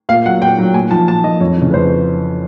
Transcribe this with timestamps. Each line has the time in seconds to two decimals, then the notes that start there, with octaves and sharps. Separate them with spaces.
0.09 A#2 F5
0.25 F#3 F#5
0.42 A#2 G5
0.58 F#3
0.74 A#2 G#5
0.91 F3 A5
1.07 A#2 A5
1.24 F3 D#5
1.40 F2 C#5
1.57 C#3 E3
1.70 B4
1.74 F2 C5